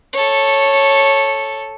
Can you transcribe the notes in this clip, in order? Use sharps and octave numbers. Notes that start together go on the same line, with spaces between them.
A4 C#5